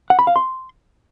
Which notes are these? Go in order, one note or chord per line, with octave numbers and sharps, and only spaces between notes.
F#5
B5
F5
C6